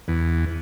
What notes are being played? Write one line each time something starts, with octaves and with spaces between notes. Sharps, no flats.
E2